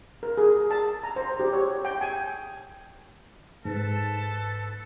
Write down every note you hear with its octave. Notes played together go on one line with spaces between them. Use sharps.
A#4
G#4
A5
A#5
C5
G4
C#5
G5
G#5
G#2 A4 B4 A5